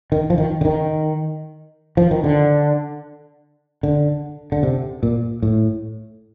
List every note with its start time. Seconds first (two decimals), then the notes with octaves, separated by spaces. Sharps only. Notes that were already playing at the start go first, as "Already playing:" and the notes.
0.12 D#3
0.30 F3
0.38 D#3
0.61 D3
0.65 D#3
1.97 F3
2.11 D#3
2.24 D3
3.83 D3
4.52 D3
4.63 C3
5.03 A#2
5.42 A2